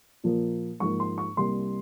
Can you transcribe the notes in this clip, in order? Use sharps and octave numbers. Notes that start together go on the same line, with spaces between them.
A#2 F3 A#3
G#2 F3 A#3 C#6
C6
C#6
C2 C3 G3 A#3 C6